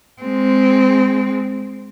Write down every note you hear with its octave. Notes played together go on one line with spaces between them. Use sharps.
G#3 C4